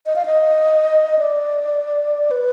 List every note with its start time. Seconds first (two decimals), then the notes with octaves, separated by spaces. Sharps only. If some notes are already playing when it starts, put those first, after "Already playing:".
0.06 D#5
0.16 F5
0.25 D#5
1.19 D5
2.31 B4